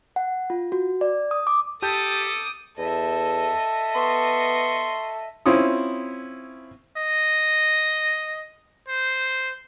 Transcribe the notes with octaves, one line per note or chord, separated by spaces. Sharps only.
F#5
F4
F#4
D5
D#6
D6
G4 A4 A5 D6 D#6 G6
E2 A4 D#5 E5
B3 C6 C#6
C4 C#4 E4 F4 C6 D#6
D#5
C5